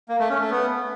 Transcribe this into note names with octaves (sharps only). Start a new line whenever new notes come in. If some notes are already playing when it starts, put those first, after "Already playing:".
A#3
A3
C#4
A3
B3